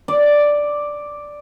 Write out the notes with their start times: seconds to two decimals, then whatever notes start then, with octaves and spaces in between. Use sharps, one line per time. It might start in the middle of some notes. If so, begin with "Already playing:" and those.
0.08 D5